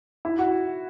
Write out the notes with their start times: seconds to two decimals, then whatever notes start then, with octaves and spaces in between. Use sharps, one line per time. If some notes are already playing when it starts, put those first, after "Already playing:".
0.25 E4
0.39 F#4